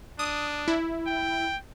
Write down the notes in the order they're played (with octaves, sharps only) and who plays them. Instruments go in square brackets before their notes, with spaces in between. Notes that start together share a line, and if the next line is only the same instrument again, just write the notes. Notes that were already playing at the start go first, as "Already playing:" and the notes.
[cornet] D4 [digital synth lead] D#6
[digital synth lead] E4
[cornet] G5